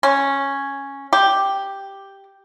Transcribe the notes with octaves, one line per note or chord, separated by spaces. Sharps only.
C#4
G4